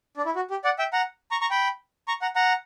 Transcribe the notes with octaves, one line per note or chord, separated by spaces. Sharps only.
D4
E4
F#4
G4
D5 F#5
E5 G5
F#5 A#5
A#5 C#6
A#5 C#6
G5 B5
A#5 C#6
F#5 A#5
F#5 A#5